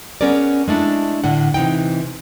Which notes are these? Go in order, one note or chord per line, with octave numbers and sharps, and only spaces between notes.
B3 C#4 G#4 A#4 D5
G#3 A3 D4 E4
A2 D3 D4 F#5
C3 E3 D#4 G5